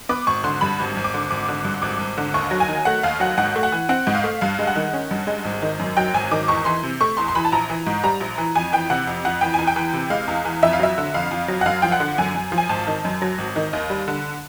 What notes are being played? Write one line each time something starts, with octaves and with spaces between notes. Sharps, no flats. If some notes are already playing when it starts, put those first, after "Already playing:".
B3 D6
G#1 C#6
D3 C6
G2 B5
G#1
G#1
D6
D3
G#1 D6
D3
G2
G#1 D6
G#1
D3
D#2 C#6
F#3
G#5
D#3
A3 F#5
D#2 F5
F#3 F#5
G#2 F#5
A3
F#5
E3
C4 F#5
G#2
F5
A3
G2 F5
G#3
F#5
D#3
C#4
G2
G#3
G#1
D#3
F#2
F#3 G5
G#1 G#5
D#3 D6
E2 C#6
E3 C6
C3
A3 C#6
E2 C6
C6
E3 B5
A5
A#1 A#5
E3
G#2
G3 A#5
A#1
E3
F2 G#5
E3 G5
C3 F#5
F2
F2 F#5
E3 G5
E2 G#5
G5
E3
C3
G#3 F5
E2
E3
F2 E5
F5
F#3 E5
D3
F2 F5
F2
F#3
F#5
F#2 F5
F3 G5
F#5
D3
F#2 G#5
F#2
F3
G#5
G#1 A5
D#3
F#2
F#3
G#1
D#3
D#2
G3
D3